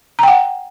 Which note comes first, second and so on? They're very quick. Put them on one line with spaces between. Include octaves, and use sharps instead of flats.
A#5 G5 F#5